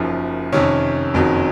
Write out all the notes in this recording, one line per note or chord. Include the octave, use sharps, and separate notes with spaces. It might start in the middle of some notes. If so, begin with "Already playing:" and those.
Already playing: F#1 F#2 F3 D#4
F2 C3 D#3 C#4
F#1 F2 D#3 F#3